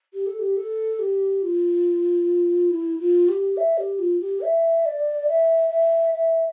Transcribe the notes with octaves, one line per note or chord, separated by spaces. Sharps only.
G4
A4
G4
A4
G4
F4
E4
F4
G4
E5
G4
F4
G4
E5
D5
E5
E5
E5